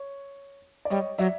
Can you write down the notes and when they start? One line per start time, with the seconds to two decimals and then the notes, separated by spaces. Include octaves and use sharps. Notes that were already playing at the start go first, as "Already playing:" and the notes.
Already playing: C#5
0.85 D5
0.90 G3 C#5 D#5
1.18 F#3 D5 E5